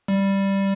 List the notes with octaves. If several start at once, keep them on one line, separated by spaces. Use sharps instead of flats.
G3